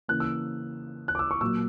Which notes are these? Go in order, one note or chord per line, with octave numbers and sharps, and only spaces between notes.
C#3 E3 A#3 F#6
E6
F#6
D6
E6
C#6
A#2 F#3 A#3 E6